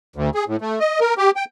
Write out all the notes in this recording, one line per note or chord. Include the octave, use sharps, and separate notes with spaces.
D2
G#4
A2
A3
D#5
A#4
G4
G5